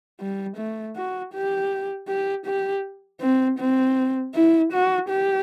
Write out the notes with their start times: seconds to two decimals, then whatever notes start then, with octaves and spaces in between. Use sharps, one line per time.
0.20 G3
0.57 A3
0.96 F#4
1.33 G4
2.08 G4
2.46 G4
3.21 C4
3.59 C4
4.35 E4
4.72 F#4
5.10 G4